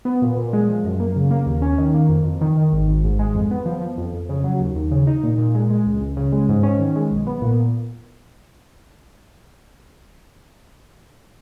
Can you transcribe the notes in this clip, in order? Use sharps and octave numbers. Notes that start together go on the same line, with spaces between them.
B3
A#2
A#2
G#3
F3
F#2
A#3
C#3
A#3
D#2
C#4
D#3
A#3
F2
F2
D#3
D#3
G#1
G#1
G#2
G#3
F2
B3
F3
F3
F2
F2
C#3
F#3
D#2
D#2
C#3
D#4
A#2
A#2
G#3
G#3
C#2
C#2
C#3
G#3
G#2
C#4
D#3
G#3
B1
B3
A#2